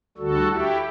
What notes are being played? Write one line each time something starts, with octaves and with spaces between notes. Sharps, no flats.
D2 D3 G3 F#4 A4
E4 G4